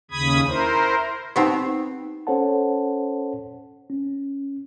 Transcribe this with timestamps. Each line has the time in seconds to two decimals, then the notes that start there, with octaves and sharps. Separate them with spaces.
0.11 D#2 C#3 B5 D#6 G#6
0.47 E4 A#4 C5
1.36 B3 C4 D#4 G4
2.27 C#4 A4 C5 C#5 F#5 A5
3.90 C#4